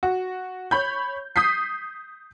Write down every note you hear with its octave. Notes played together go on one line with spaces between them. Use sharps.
F#4
C#5 B5 G6
D#6 G6 B6 C7